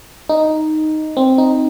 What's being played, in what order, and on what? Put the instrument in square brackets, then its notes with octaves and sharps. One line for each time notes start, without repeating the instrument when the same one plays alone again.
[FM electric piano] D#4
C4
D#4